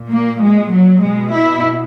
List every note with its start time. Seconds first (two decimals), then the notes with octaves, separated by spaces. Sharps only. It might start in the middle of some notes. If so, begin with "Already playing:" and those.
Already playing: A#2
0.10 A#3
0.41 G#3
0.72 F#3
1.02 B2 G#3
1.33 E4